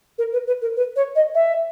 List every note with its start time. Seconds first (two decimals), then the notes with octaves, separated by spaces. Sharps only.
0.18 A#4
0.32 B4
0.47 B4
0.62 A#4
0.76 B4
0.96 C#5
1.15 D#5
1.35 E5